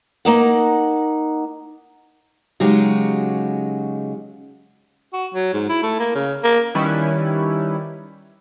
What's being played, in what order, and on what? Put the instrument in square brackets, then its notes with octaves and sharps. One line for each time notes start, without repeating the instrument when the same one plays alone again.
[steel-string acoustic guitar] A#3 D#4 F#5
C#3 F#3 G#3 D#4 F#4 G4
[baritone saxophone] F#4
F#3
G#2
E4
A3
A#3
C#3
A#3
[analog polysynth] D#3 G3 C#4 E4 B4